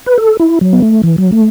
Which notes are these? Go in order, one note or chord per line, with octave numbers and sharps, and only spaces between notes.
B4
A4
E4
F#3
B3
A3
E3
F#3
A3